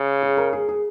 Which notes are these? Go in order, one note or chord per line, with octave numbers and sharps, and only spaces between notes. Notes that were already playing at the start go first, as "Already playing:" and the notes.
Already playing: C#3
G#4
A#4
G#4
G#4